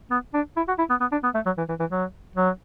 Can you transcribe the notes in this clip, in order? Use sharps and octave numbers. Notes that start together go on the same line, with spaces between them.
B3
D4
E4
F#4
E4
B3
B3
D4
B3
A3
F#3
E3
E3
E3
F#3
F#3